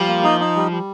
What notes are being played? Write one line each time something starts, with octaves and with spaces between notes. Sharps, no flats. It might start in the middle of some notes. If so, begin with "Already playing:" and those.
Already playing: F3 G3
A#3
D#4
D#4
G3
G3